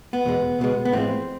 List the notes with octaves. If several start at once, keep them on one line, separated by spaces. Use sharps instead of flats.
B3
E2 B2 G#3
C#2 B2 G#3
B3
A2 F3 G#3 C4